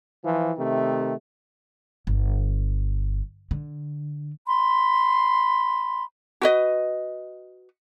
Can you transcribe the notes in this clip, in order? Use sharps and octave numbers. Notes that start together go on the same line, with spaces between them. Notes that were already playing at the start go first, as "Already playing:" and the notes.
E3 F3
C3 D#3 A3
G1
D3
B5 C6
F#4 B4 D#5